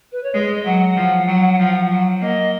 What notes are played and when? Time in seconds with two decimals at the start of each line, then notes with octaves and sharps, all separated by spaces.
0.12 B4
0.23 C#5
0.34 G#3 D#5
0.65 F#3 F#5
0.97 F3
1.28 F#3
1.59 F3
1.90 F#3
2.21 A#3 D#5